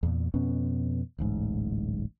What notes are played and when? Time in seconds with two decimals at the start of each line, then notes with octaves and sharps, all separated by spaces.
0.03 E2 A#2
0.34 F2 B2 B3 C#4
1.18 D1 A1 G#2